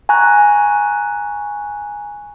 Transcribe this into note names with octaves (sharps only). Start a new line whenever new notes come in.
G#5 A#5 C#6 F#6